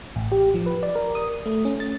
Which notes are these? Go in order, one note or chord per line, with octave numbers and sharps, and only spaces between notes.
A1
G4
F3
B4
D5
A#4
D#6
A3
C#4
A6